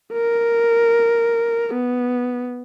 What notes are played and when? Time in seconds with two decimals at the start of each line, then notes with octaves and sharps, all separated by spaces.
0.13 A#4
1.74 B3